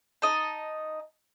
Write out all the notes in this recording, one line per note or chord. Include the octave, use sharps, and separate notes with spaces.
D#4 D#5 A5